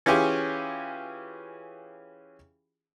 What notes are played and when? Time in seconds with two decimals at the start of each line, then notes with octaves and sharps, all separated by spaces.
0.06 E3 C#4 F4 G4 G#4